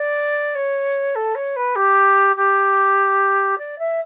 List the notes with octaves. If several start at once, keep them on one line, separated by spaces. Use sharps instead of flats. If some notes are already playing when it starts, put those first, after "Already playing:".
Already playing: D5
C#5
A4
C#5
B4
G4
G4
D5
E5